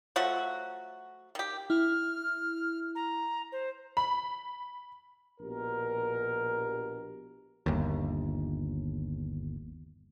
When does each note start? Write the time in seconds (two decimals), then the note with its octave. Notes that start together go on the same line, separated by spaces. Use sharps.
0.16 F3 F#3 A3 F#4
1.35 D#3 G4
1.70 E4 F6
2.95 A#5
3.52 C5
3.97 B5
5.40 A#1 B2 G4 A#4
7.66 G1 D#2